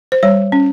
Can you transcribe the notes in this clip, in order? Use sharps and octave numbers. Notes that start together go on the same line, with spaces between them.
C5
G3 C#5
C#4